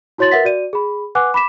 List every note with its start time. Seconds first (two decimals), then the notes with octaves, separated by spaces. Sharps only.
0.18 E4 F#4 C#5 C6 A6 F#7
0.31 A#4 B4 E5 F#5 A6 B6
0.45 F#4 D5 D#7
0.73 G#4 B5
1.15 B4 F#5 G#5 D6 F#6
1.34 B5 D6 B6 E7